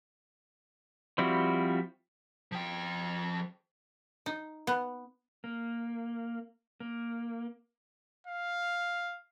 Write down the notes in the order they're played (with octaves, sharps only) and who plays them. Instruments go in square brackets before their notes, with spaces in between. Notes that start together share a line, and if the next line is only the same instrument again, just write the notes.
[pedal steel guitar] F3 G3 C4 E4 F#4
[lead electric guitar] F3 G5
[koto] D#4
B3
[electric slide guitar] A#3
A#3
[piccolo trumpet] F5